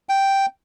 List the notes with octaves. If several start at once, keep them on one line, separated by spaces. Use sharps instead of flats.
G5